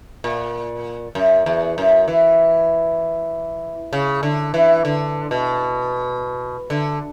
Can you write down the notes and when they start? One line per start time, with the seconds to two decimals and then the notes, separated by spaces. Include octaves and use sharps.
0.24 A#2
1.15 F#2
1.46 E2
1.78 F#2
2.08 E3
3.93 C#3
4.23 D3
4.54 E3
4.85 D3
5.31 B2
6.70 D3